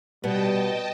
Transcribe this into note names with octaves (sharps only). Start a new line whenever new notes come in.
B2 G3 B3 D#5 G5 A5